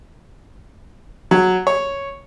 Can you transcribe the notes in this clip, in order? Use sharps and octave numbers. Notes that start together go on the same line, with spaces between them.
F#3
C#5